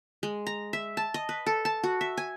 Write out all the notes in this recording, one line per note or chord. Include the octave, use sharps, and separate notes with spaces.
G#3
A#5
E5
A5
D#5
B4
A4
A5
F#4
E5
G#5